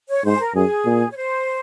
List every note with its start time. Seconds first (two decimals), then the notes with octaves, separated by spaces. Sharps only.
0.09 C#5
0.25 G#2 C5
0.33 G#4
0.39 A#4
0.55 F#2 G#4
0.85 A#2
1.11 C#5
1.16 C5